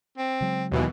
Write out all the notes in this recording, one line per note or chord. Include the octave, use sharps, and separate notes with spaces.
C4
C#3 F#3 G#3
D#2 B2 E3